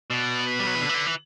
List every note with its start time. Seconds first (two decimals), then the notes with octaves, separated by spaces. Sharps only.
0.10 B2 D5
0.47 B4
0.59 G3
0.67 F#3
0.75 E3
0.82 D3
0.89 E3
0.94 D3
1.06 E3